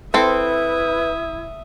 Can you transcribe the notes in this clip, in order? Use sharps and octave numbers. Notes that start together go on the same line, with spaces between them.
C4 E4 A4 B4 C5 E5 D#6